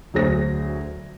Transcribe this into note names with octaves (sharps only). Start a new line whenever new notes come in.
D2 F#3 G#4 C5 A#6